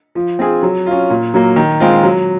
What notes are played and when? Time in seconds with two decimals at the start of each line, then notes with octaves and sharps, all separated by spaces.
0.15 F3
0.39 C4 F4 G#4
0.63 F#3
0.86 C#4 F4
1.10 A#2
1.34 F#3 A#3
1.56 D#3
1.80 G#3 C4 F4
2.03 F#3